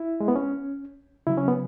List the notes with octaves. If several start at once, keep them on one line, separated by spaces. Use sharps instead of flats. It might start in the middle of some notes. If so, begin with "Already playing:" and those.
Already playing: E4
G#3
B3
C#4
C#3 F#3 E4
C#4
B3